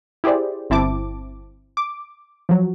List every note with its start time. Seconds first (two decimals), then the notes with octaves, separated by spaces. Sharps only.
0.24 E4 G4 G#4 C5 D5
0.70 G1 C4 E4 A5 D6
1.77 D6
2.49 F3 F#3